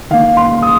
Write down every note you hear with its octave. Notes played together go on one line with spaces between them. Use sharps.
D#3 A#3 F5
C6
D#6